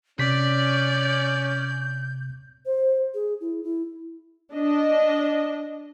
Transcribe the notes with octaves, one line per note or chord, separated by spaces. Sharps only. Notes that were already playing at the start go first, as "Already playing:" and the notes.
C3 C#4 D5 G6 B6
C5
G#4
E4
E4
D4 D#5